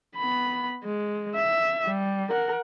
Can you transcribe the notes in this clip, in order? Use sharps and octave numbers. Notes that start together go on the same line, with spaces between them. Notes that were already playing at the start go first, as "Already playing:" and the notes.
B3 B5
G#3
E5
G3
A#4 F#5